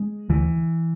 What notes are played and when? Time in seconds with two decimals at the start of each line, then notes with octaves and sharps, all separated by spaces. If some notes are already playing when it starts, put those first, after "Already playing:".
Already playing: G#3
0.29 D2 E3